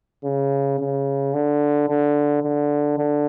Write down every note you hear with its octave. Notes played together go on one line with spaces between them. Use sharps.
C#3
C#3
D3
D3
D3
D3